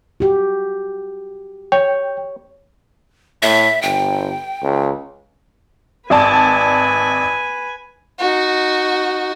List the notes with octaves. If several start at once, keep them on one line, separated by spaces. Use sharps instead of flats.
F#4 G4
C#5 G5
A2 E5
G1 G5
C#2
G#1 B4 D5 G#5 A5
D#4 F#4